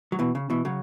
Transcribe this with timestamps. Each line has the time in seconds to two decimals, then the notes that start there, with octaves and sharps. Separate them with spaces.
0.12 F#3
0.19 B2 E3
0.35 C#3
0.50 B2 E3
0.65 C#3 F#3